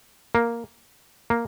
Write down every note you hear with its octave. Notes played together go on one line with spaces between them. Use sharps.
A#3
A#3